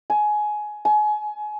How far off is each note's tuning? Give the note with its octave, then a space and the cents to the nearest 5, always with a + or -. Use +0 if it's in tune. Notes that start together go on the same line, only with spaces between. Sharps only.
G#5 +20
G#5 +30